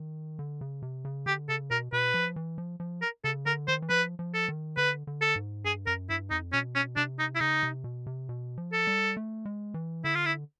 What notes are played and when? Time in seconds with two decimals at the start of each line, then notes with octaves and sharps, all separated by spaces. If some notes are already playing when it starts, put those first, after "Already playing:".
Already playing: D#3
0.39 D3
0.61 C#3
0.82 C3
1.05 C#3
1.26 D3 G4
1.49 C#3 A4
1.71 B2 A#4
1.92 B2 B4
2.14 F3
2.36 E3
2.58 F3
2.80 F3
3.02 A#4
3.24 C#3 A4
3.46 D3 A#4
3.68 D#3 C5
3.82 E3
3.89 F3 B4
4.19 F3
4.34 A4
4.49 D#3
4.77 D3 B4
5.07 D3
5.21 A4
5.36 G#2
5.65 G2 G#4
5.86 F#2 A#4
6.09 G2 E4
6.30 F2 D#4
6.53 B2 C#4
6.75 C#4
6.96 C3 D4
7.19 D#4
7.35 E4
7.40 C#3 D#4
7.63 C3
7.84 B2
8.07 C3
8.29 B2
8.58 F3
8.73 A4
8.87 G3
9.17 A3
9.45 G#3
9.74 E3
10.04 D3 E4
10.15 F4
10.25 E4